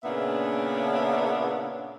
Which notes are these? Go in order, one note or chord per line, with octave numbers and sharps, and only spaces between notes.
A#2 C#3 B3 D4 E5